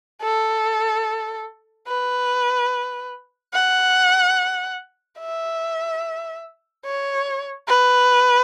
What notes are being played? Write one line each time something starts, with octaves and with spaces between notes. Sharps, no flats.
A4
B4
F#5
E5
C#5
B4